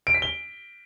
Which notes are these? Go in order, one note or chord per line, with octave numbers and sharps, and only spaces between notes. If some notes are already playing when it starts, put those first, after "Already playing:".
D7
B6
G7